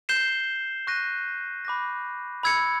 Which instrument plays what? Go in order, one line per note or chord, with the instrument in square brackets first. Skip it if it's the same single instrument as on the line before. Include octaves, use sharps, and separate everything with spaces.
[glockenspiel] G6 C7 E7 G7
C#6 F#6 A#6 D#7
B5 D6 F#6 A#6
B5 E6 G#6 C#7